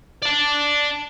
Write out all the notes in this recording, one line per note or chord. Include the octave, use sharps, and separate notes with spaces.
D5 A5